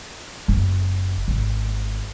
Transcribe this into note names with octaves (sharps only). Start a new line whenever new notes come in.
F#1
G#1